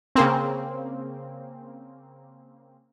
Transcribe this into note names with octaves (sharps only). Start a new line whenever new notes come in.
C#3 A#3 C4